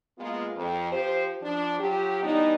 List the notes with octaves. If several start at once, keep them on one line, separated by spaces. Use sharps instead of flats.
G#3 A#3 B3 F4
F2
F3 F4 G4 C5
F3 D4
F#3 F4 G4
E3 G3 B3 D4 D#4